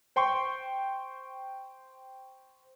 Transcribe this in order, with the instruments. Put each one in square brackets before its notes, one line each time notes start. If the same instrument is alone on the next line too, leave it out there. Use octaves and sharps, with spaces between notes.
[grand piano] C5 G5 C6 C#6